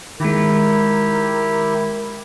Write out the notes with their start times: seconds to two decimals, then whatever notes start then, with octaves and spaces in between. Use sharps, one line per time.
0.20 D#3 G#3 E4 G4 A#4